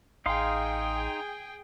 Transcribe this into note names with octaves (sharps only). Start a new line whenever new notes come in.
A1 D#4 G#4 F5 G5 C6